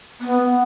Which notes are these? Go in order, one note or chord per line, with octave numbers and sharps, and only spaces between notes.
B3